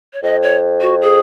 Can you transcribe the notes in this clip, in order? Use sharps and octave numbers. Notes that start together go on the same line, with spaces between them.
C#5
F2 D#5
C#5
F#4
G#4